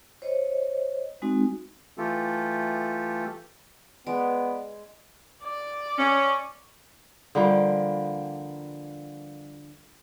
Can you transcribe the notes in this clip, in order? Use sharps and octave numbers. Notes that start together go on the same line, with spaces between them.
C5 C#5 D#5
G#3 C4 D#4 F#4
E3 A3 F4 G4 A4
G#3 B3 D5
D5
C#4
D3 F3 G3 A#3